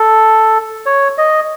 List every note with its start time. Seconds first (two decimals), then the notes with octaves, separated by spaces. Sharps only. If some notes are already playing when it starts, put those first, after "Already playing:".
Already playing: A4
0.86 C#5
1.18 D#5